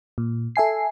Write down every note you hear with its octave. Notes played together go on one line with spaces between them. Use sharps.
A#2
A4 E5 G#5 C7